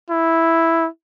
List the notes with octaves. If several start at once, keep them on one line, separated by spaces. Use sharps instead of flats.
E4